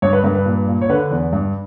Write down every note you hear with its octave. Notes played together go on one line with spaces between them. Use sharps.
G2 C#5
B4
G2 A#4
B4
A#2
A#2
C#5
D3 B4
E2
G2